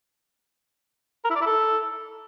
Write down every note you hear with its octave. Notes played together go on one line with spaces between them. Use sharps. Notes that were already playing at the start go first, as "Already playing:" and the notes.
A#4
E4
D5
E4
A4